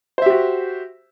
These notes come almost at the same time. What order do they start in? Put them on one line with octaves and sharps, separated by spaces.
C5 E5 G4 F#4